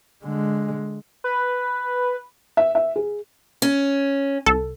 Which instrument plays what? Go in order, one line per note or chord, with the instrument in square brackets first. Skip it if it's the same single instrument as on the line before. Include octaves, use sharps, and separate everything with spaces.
[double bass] D3 G#3
[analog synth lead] B4
[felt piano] E5
E5
G#4
[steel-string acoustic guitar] C#4
[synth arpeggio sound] C2 A4